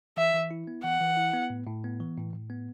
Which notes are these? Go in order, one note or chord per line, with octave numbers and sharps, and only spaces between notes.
E3 E5
E3
E4
B3
E3 F#5
E3
E4
B3
A2
A2
B3
E3
A2
A2
B3